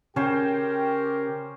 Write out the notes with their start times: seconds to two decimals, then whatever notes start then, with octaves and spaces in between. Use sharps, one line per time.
0.16 C#3 C#4 G4 A#4 C5 G5